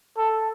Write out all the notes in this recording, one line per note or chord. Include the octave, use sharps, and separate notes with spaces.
A4